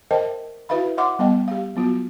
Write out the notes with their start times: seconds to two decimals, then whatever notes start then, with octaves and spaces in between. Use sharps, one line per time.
0.11 A#4 C5 D#5 E5 G5 A5
0.69 E4 F#4 B4 E5 F5 B5
0.97 C#5 E5 F#5 C6 D6
1.19 G3 B3 D#5 G5
1.48 G4 F5
1.75 F#3 B3 F4 F#4